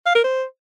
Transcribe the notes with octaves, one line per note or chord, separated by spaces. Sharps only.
F5
A#4
C5